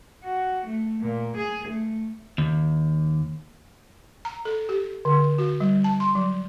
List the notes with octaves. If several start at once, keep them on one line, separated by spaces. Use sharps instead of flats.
F#4
A3
A#2
G#4
A3
D#2
A#5
A4
G4
D3
F#4
G3
A5
C6
F#3